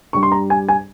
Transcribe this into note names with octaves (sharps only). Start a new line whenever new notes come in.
G2 G3 C#6
C6
A#5
G#5
G#5